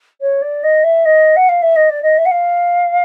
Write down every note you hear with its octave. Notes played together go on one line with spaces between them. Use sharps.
C#5
D5
D#5
E5
D#5
F#5
F5
E5
D#5
D5
D#5
E5
F#5
F5